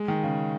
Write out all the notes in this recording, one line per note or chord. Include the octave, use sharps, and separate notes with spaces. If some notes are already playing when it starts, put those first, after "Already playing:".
Already playing: G#3
D#3
C#3